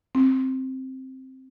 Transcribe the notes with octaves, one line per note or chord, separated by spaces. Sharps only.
C4